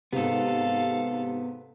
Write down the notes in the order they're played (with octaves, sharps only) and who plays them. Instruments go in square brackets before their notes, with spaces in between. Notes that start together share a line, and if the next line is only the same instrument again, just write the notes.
[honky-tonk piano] G#2 C3 [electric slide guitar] B3 [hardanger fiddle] A4 F5